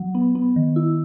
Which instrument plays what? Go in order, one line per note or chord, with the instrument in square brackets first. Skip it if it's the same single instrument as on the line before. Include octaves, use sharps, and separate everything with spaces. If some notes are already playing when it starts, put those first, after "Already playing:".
Already playing: [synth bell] F#3
B3
B3
D#3
E4